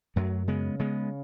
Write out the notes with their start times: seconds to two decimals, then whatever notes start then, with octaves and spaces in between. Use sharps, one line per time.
0.16 F#2 F#3 A3
0.48 C#3 G#3 B3
0.79 C#3 G#3 B3